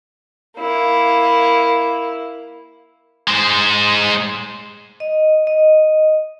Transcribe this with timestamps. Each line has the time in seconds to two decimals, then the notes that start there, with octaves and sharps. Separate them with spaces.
0.59 A#3 E4
3.28 G#3 C5
5.00 D#5
5.47 D#5